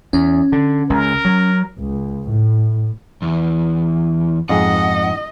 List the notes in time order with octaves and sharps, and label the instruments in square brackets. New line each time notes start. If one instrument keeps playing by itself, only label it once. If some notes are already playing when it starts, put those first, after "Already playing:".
[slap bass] E2 [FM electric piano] C#4
[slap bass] D3
[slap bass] C#2 [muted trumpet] A#4
[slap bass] F#3
[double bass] C#2
A2
[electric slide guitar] E2
[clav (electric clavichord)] F2 G#2 G#4 [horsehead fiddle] D#5 [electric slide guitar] F#5